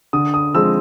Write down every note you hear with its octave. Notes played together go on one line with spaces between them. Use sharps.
D3 D#6
D#6
F3 G#3 C4 E6